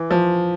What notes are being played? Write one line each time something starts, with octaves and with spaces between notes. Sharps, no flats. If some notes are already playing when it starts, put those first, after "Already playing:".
Already playing: E3
F3